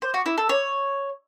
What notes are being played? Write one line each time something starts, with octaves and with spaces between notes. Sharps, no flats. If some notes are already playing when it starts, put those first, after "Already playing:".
C5
F#4
E4
A4
C#5